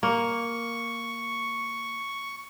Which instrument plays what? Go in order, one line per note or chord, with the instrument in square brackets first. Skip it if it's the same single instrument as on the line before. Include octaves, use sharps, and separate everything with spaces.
[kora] A#3 [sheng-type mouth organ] C#6